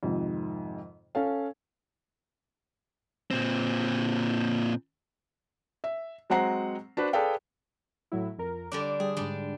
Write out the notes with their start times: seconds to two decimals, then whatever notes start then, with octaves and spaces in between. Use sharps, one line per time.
0.03 F2 G#2 C3 D#3
1.15 C#4 A4 F5
3.31 A#2 C4
5.84 E5
6.30 F#3 G#3 C4 F#5 A#5 C7
6.97 D4 F#4 B4 C5
7.13 G#4 A4 B4 D5 F5 G5
8.12 A2 F#3 E4
8.38 F2 A#4
8.72 D3 G3 D4 D6
9.00 G3 G#4
9.17 G#2 D3 G3 D4